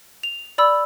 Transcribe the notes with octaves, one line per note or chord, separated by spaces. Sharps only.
F7
D5 B5 E6